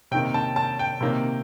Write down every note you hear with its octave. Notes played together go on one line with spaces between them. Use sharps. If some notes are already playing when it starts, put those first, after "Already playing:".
C3 D#3 A#3 G5
A5
A5
G5
C3 D#3 A#3